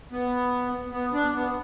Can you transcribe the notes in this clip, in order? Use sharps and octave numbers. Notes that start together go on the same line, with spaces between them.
B3
B3
D4
B3